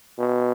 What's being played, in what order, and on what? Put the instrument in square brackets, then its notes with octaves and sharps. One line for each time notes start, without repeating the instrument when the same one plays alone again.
[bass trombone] B2